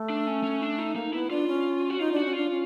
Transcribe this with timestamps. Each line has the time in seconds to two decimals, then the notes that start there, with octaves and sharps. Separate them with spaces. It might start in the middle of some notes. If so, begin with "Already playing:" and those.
Already playing: A3
0.10 D4
0.27 C#4
0.43 C#4
0.61 D4
0.79 D#4
0.95 A#3 D#4
1.13 B3 E4
1.30 D4 F4
1.47 C#4
1.90 F#4
1.99 D#4 F4
2.12 D4 F#4
2.25 C#4
2.33 D4 F4
2.50 C#4